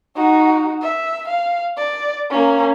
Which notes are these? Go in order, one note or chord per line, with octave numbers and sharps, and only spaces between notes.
D#4 F#4
E5
F5
D5
A#3 C#4